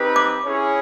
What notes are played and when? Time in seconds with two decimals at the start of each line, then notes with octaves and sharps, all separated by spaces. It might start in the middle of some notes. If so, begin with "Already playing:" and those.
Already playing: C4 D#4 G4 B4
0.16 D6
0.46 C#4 E4 G#4 C#5